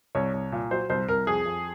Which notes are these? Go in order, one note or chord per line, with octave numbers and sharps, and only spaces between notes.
C2 C#5
C2
A#2
F#3 C5
C2 C5
C2 A#4
F2 G#4
F2